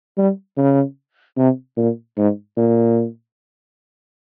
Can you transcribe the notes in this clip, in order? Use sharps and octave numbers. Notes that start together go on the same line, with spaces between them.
G3
C#3
C3
A#2
G#2
A#2